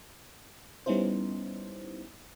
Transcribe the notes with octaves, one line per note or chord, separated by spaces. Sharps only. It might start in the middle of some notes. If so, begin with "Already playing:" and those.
G3 B3 C#4 D#4 E4 C5